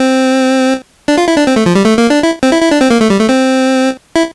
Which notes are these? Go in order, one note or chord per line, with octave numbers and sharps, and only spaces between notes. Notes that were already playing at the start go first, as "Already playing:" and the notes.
Already playing: C4
D4
F4
E4
D4
C4
A3
F3
G3
A3
A#3
D4
E4
C4
E4
E4
D4
C4
A#3
A3
G3
A3
C4
E4